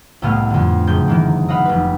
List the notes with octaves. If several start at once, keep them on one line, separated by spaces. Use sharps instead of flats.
C2 A2 A3 B3 F5 F6
F2 D3
F#1 G6
D#3 E3 A#3
D#5 F5 F#5 B5 F6
F1 B4